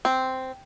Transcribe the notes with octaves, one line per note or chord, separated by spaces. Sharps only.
C4